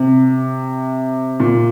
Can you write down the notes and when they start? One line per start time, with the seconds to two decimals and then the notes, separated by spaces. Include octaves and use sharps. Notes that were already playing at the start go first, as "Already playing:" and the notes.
Already playing: C3
1.40 A#2